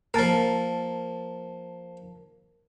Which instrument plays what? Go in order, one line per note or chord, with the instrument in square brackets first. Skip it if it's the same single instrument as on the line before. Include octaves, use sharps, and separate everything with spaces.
[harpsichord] F3 A#3 [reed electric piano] A#4 A5